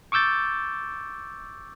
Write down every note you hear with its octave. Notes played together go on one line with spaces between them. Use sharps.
C#6 D6 E6 G6 A6